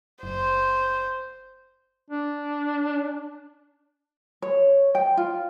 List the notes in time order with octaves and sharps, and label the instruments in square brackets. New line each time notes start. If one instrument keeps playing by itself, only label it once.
[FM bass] F#1 [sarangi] C5
[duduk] D4
[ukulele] C#5
G5
F4